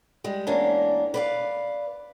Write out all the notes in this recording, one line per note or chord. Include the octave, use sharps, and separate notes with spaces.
G3 G#3
E2 G#3 A#3 C#4 D4
B4 D5 F5